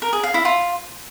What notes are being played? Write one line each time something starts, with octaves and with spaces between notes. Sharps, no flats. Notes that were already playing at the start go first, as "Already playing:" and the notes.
A#4
G#4
F5
E4
F4